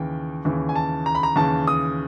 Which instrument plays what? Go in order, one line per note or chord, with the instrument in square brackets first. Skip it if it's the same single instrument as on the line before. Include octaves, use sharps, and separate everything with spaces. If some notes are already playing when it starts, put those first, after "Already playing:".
Already playing: [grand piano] D#2 C#3 E3 G5
D#2 C#3 E3
G#5
A5
A#5
B5
A#5
D#2 C#3 E3 A5
D#6